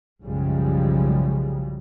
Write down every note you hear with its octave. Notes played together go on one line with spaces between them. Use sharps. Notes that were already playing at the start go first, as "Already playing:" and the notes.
B1 F#2 C#3 F3 G3 G#3